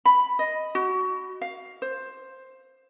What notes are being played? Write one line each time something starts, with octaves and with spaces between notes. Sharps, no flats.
B5
D#5
F#4
F5
C5